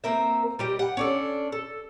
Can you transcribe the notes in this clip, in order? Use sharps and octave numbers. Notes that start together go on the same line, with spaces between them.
A#3 C4 A#4 E5
G3 G4 D#5
F#5 G5
C#4 D4 A4
A4